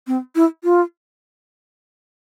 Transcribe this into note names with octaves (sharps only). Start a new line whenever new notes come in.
C4
E4
F4